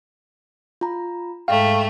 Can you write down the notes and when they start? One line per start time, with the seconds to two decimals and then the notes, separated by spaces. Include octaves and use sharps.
0.81 F4 A#5
1.48 G#2 A3 F5 G5